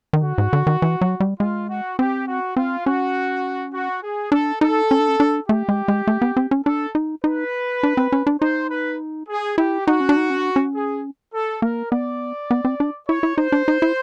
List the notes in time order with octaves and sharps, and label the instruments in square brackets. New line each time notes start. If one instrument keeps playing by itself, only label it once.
[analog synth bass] D#3
[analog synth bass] D3 [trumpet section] F#4
[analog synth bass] G#2
D3
D#3
E3
F#3
G3
[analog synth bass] G#3 [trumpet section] F4
[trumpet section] F#4
[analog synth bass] C4 [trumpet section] G4
[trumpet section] F#4
[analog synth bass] C4 [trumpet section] F4
[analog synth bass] C#4 [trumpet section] F#4
[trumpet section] F#4
G#4
[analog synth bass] D4 [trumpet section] A4
[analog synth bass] D#4 [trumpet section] A4
[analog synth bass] C#4
D4
C#4
D4
[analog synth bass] A3 [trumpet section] G4
[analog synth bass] G#3
G#3
A3
B3
C4
C#4
[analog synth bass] D4 [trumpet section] A4
[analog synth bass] D#4
[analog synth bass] D#4 [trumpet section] B4
[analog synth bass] D4
C4
C#4
D4
[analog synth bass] D#4 [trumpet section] C5
[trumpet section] B4
G#4
[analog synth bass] E4 [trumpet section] G4
[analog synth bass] D#4 [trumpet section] F#4
[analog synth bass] C#4
D4
D#4
C#4
D4
C#4
[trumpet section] G#4
A4
[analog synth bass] A#3 [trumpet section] A#4
[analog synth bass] B3 [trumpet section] D5
[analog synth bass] B3
C4
D4
[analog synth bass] E4 [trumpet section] C#5
[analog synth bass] E4
[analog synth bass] D#4 [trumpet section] C5
[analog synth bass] D4
D#4
E4